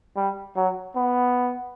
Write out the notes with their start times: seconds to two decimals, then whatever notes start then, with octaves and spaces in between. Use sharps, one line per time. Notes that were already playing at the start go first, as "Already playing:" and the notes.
0.16 G3
0.56 F#3
0.96 B3